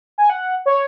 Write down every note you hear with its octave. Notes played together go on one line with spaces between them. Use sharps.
G#5
F#5
C#5